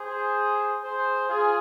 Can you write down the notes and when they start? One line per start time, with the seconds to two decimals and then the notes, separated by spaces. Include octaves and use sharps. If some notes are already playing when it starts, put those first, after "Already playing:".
Already playing: G#4 C5
0.83 G#4 C5
1.28 F4 G#4